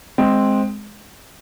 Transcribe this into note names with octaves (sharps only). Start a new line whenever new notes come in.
G#3 C4